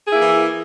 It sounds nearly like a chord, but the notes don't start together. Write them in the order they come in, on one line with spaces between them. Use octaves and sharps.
G#4 E4 A#3 E3